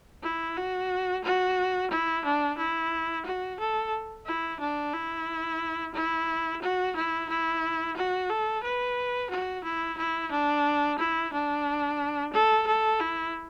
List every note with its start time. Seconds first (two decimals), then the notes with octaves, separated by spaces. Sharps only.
0.23 E4
0.56 F#4
1.23 F#4
1.91 E4
2.25 D4
2.57 E4
3.25 F#4
3.59 A4
4.25 E4
4.60 D4
4.94 E4
5.94 E4
6.62 F#4
6.96 E4
7.29 E4
7.96 F#4
8.29 A4
8.63 B4
9.30 F#4
9.64 E4
9.97 E4
10.31 D4
10.98 E4
11.32 D4
12.33 A4
12.67 A4
13.00 E4